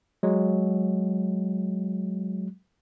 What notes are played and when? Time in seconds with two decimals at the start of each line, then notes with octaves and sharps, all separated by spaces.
0.23 F#3 G#3